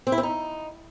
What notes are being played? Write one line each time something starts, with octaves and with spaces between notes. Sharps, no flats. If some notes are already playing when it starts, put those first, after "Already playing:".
C4
E4
C4
D#4